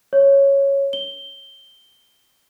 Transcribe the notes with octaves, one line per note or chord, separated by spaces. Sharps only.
C#5
G7